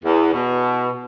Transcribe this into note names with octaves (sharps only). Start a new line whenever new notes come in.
E2
B2